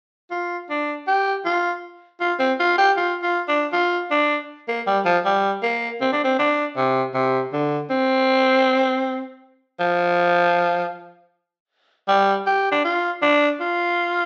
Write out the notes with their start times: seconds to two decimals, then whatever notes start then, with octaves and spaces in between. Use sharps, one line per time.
0.31 F4
0.70 D4
1.07 G4
1.45 F4
2.20 F4
2.39 C4
2.60 F4
2.78 G4
2.97 F4
3.22 F4
3.48 D4
3.73 F4
4.11 D4
4.68 A#3
4.86 G3
5.05 F3
5.25 G3
5.63 A#3
6.01 C4
6.12 D4
6.24 C4
6.39 D4
6.77 C3
7.14 C3
7.53 D3
7.90 C4
9.80 F3
12.08 G3
12.46 G4
12.72 D4
12.85 F4
13.22 D4
13.60 F4